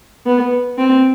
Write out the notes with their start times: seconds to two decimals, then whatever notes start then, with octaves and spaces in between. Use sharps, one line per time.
0.26 B3
0.78 C4